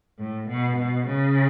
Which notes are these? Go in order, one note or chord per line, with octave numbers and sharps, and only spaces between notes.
A2
B2
B2
C#3